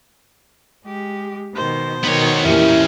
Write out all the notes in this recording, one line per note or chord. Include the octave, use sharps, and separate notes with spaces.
G#3 G4
B2 D#3 C5
B2 D#3 B3 C#5
F2 A#2 E3 C#4 E4 G4 A#4